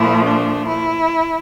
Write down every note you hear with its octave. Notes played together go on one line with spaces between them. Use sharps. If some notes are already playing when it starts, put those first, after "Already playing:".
Already playing: A#2 F3 A3 E4
D4
E4